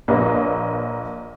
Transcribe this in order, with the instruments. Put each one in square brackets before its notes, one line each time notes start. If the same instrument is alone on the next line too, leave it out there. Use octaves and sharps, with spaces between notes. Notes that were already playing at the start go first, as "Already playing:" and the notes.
[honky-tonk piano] A#1 A#3 B4 C#5 D#5 A#5